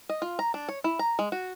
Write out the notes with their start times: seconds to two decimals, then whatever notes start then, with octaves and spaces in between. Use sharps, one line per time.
0.09 D#5
0.22 F4
0.39 A#5
0.54 D4
0.69 C#5
0.84 E4
0.99 A#5
1.19 G#3
1.32 F#4